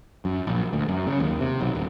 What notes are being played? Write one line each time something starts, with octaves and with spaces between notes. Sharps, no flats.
F#2
A#1
D2
F#2
C#3
D#2
C3
B1
D#1